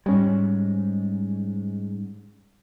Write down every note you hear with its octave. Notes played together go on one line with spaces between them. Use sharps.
G#2 G3 G#3 C#4